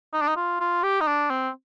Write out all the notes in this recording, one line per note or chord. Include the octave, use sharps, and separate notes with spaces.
D#4
D4
D#4
F4
F4
G4
D#4
D4
C4